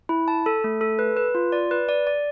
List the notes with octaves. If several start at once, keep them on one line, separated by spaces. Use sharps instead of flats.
E4
A5
A4
A3
A4
B4
B4
F4
D5
B4
D5
D5